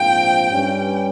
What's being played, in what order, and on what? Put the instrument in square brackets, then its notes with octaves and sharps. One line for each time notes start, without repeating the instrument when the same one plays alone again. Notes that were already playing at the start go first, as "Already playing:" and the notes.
Already playing: [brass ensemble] A#1 G#2 F3 C4 F4 [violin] G5
[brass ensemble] G2 G3 C#4